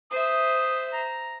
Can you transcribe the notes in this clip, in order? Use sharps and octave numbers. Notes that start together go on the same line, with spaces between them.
C5 E5 D#6
A#5